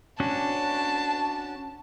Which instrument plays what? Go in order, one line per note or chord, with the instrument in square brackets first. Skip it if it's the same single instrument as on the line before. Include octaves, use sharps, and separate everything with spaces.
[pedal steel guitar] C#4 D4 F#4 [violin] A5